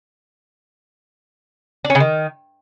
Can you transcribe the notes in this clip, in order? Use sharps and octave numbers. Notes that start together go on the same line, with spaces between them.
D4
C#4
C#3
D#3